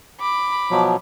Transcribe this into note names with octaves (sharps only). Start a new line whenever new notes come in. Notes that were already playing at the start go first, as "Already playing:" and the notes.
B5 D6
B2 F3 F#3